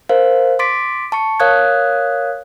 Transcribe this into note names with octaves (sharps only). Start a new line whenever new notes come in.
A#4 C5 F5
C6 D6 A6 B6 D7
A5 C#6 C#7
A#4 C#5 F5 D#6 F#6 G#6